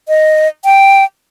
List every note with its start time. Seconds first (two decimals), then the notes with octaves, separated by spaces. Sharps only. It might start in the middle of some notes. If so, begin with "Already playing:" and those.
0.08 D#5
0.65 G5